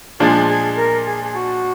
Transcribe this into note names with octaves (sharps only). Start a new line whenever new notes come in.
A#2 F3 G#3 D4 G#4
G#4
A#4
G#4
G#4
F#4